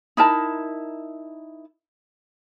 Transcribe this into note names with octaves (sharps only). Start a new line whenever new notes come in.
D#4 E4 A#4 A5